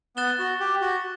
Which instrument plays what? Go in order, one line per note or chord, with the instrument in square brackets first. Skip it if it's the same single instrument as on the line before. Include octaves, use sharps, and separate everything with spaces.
[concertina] B3 [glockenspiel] F#6 A6 E7 G7
[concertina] F#4
G4
F#4